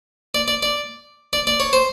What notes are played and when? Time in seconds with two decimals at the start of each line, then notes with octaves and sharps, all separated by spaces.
0.35 D5
0.48 D5
0.63 D5
1.33 D5
1.47 D5
1.60 C#5
1.73 C5